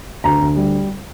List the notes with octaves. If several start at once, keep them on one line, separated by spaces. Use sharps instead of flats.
D2 A#5
D2
G3